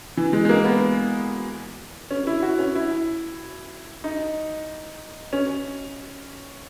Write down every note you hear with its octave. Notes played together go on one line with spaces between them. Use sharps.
E3
G#3
G#3
A#3
B3
C#4
E4
F#4
C#4
E4
D#4
C#4